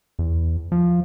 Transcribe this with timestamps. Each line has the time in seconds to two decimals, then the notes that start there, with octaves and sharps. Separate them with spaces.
0.19 E2
0.72 F3